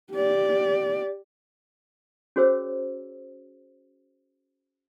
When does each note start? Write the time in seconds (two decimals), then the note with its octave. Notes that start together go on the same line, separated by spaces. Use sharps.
0.12 G4 D5
2.36 C#4 F#4 G#4 C5 C#5 E6